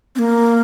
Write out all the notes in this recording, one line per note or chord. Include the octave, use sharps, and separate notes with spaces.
C4
A#3